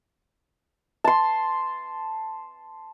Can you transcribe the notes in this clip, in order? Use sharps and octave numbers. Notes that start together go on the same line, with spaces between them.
A5 C6